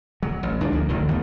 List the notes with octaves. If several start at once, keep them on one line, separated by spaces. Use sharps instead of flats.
F#3
A1
D#2 G#3 D4
D2 F3 A#3
A1 D2 A2 D#3
D#2 D#3 A3 B3